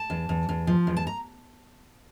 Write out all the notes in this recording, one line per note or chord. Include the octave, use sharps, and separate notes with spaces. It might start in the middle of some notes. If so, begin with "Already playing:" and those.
Already playing: A5
E2
E2
E2
F3
E2
A5
A#5